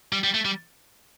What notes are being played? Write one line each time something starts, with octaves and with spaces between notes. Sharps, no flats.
G3
G3
A3
G3